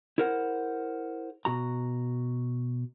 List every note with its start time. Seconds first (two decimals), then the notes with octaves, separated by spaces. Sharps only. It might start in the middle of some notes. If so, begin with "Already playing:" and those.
0.18 E4 G#4 A#4 C5 F#5
1.45 B2 F#4 A#5